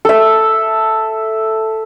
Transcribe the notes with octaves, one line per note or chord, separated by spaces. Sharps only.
A4 E5